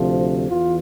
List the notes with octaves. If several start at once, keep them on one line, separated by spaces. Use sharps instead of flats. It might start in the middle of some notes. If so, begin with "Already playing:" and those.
Already playing: D2 C3 F3
E2 E3 F4